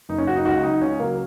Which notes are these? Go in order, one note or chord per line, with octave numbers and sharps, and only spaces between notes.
F#1 D#4
C#4
F#2 C#3 F#4
D#4
C#2 F#4
C#3 F#3 D#4
C#2 C#4
C#3 F#3 A#3